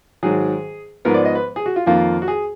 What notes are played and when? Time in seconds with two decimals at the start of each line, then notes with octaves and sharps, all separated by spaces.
0.23 G#2 D#3 F#3 G#4
1.05 G#2 F3 B3 A#4
1.14 D5
1.25 D#5
1.35 B4
1.56 G#4
1.66 F#4
1.76 F4
1.86 F2 D#3 A#3 F4
2.22 F#4
2.28 G#4